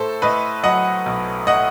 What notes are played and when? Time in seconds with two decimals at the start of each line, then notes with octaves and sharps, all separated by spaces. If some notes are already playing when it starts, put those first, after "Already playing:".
Already playing: A2 A4 C5
0.22 A2 B4 D#5
0.64 F#3 D#5 F#5
1.06 B1
1.47 A2 D#5 F#5